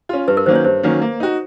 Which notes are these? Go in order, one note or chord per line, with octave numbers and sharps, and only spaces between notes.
C#4 F4
G2 B4
A#4
D#3 F#3 A#3 C#4 C5
C#5
G2 C5
D#3 F#3 A#3 C#4
A#3
D#4 F#4